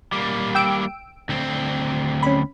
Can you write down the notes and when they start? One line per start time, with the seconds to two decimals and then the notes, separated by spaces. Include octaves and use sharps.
0.13 G3 A#3
0.55 G5 E6 D7
1.29 D2 C4
2.23 C#4 B5